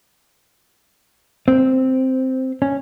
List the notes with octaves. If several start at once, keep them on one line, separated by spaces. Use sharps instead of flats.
C4
C#4